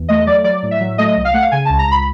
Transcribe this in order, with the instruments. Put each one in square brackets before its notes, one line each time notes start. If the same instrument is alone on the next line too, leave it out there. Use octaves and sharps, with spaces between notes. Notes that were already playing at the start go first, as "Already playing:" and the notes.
Already playing: [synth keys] E2
A3 D#5
F#3 D5
F#3 D5
A2
E5
F#3
A3 D#5
C2
F5
A3 F#5
F5
C#3 G#5
C#2 A5
A#5
C#2 B5